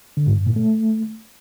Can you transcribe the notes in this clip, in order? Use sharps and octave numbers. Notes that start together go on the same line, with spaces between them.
D3
G#2
G2
A#2
A3